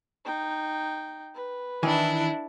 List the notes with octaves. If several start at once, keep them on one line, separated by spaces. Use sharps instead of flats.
D#4 G5
B4
D#3 E3 D4 E4 G#5